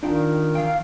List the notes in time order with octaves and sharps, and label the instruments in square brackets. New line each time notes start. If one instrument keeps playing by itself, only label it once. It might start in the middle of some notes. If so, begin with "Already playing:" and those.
[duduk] D#3 [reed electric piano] D4 F4 [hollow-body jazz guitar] D#4 G5
[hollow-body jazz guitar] E3 G5 [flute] F5